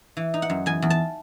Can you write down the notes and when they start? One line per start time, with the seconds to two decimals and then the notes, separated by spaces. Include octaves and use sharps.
0.17 E3
0.34 D#4
0.42 F#5
0.50 F#2
0.66 E2 G#5
0.82 E2
0.90 A5